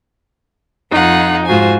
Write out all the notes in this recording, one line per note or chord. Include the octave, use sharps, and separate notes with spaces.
F2 D#4 F4 F#5
G#2 F4 F#4 C5 G#5